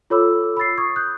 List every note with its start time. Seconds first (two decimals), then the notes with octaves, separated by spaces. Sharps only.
0.10 F4 A4 C#5 B5 D6 E6
0.57 B5 E6 A6 C7
0.78 C#6 D#6 G#6
0.96 D#6 F#6 G6